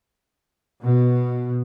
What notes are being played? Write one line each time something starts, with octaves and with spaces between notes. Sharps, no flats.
B2